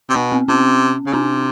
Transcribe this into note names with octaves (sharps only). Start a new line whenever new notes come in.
C3
B2 B3
C4
C3 C#4
C#3
C3 C4 D4